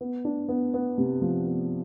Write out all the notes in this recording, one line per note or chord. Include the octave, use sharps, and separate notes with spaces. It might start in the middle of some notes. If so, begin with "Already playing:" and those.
B3
D4
B3
B3
C3
F3
B3